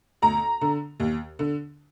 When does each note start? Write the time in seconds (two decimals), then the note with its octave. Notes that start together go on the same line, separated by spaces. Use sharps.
0.22 D2 A#5
0.61 D3
1.00 D#2
1.39 D3